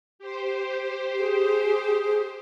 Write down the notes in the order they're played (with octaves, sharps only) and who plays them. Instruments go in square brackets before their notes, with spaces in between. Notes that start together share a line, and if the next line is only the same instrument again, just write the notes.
[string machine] G4 C5
[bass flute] G#4